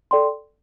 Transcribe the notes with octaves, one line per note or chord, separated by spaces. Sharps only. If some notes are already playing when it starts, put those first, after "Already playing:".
A4 D5 G5 C6